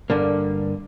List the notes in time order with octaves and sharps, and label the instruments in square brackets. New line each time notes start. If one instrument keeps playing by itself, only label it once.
[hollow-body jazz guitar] G2 D3 A#3